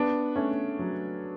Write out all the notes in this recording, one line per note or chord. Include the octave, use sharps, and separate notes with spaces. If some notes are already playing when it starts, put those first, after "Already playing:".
Already playing: B3 D4
A3 C#4
F#3 A3